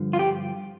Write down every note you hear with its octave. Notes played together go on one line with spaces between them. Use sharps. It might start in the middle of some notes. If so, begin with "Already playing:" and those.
Already playing: G2 D3 F3
F4
G4